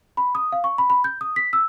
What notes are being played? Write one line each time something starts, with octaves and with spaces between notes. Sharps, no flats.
B5
D#6
F5
C#6
B5
B5
G6
D#6
B6
E6